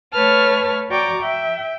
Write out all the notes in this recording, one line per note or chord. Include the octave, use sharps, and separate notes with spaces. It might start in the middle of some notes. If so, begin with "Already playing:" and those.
A3 B4 C#5 A5 F6
F#4 D5 G5 A#5 C#6 D6
E5 G5